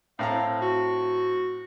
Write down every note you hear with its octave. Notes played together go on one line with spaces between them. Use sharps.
A2 C4 F5 A#5
F#4